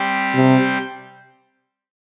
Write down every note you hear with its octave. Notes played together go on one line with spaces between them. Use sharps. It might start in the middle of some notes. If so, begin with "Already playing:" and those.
Already playing: G3 C4 G4
C3